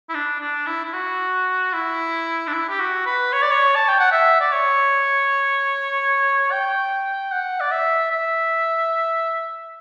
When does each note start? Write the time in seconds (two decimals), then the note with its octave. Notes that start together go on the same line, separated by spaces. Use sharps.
0.09 E4
0.14 D4
0.40 D4
0.66 E4
0.84 E4
0.93 F#4
1.73 E4
2.47 D4
2.53 E4
2.69 G4
2.79 F#4
3.06 B4
3.33 C#5
3.42 D5
3.51 C#5
3.76 A5
3.88 G5
4.00 F#5
4.12 E5
4.40 D5
4.52 C#5
6.51 G5
7.31 F#5
7.60 D5
7.71 E5
8.11 E5